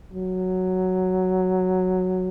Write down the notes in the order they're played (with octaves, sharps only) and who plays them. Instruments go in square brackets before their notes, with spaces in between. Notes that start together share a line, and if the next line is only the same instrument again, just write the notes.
[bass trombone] F#3